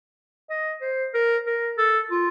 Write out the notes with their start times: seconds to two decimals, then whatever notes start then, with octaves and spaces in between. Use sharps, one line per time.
0.50 D#5
0.81 C5
1.14 A#4
1.46 A#4
1.78 A4
2.11 F4